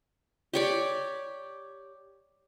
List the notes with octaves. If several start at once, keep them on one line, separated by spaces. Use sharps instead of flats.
G4 C#5 D5